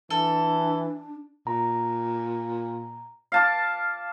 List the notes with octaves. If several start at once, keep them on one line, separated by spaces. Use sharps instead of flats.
E3 D4 A4
A#2 A#5
F5 A5 D6